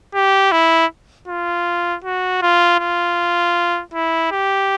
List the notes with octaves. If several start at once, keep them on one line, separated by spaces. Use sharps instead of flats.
G4
E4
F4
F#4
F4
F4
E4
G4